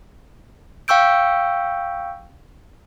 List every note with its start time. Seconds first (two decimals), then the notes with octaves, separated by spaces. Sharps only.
0.88 F5 G5 C#6 E6 G6 D7